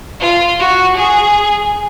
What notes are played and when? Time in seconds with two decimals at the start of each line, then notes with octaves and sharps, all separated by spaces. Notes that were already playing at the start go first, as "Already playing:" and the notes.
0.20 F4
0.59 F#4
0.96 G#4